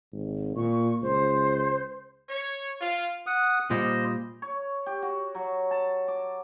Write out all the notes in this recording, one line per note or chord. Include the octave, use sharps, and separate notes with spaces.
G#1
A#2 C#6
C#2 C5
C#5
F4
F#5 D#6
A#2 G3 F4 C5 D#5
C#5
G4
F#4
F#3
A5
D6